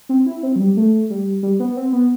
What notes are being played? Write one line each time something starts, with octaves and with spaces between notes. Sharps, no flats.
C4
E4
C4
F#3
G3
A3
G3
G3
B3
C4
B3